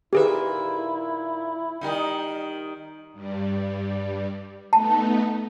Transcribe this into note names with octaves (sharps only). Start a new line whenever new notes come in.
A#2 D#3 E4 G4 G#4 B4 E5
D#3 G3 D#4
G2 G3
A3 B3 D#4 A5